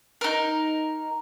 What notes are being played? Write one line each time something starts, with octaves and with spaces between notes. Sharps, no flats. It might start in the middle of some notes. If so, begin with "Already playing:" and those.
D#4 A#4